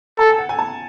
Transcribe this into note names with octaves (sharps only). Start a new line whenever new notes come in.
A4 A5
G#5
F#5
G#5
A5